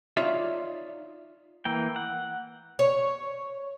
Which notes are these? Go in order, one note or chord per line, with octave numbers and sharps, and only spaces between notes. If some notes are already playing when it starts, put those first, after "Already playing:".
D#4 F4 C#5 D5 E5
E3 A#3 G5
F#5
C#5